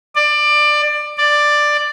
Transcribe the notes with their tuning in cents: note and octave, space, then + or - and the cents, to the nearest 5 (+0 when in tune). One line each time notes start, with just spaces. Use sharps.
D5 +20
D5 +10